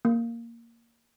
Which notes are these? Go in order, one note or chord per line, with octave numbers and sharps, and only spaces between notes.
A#3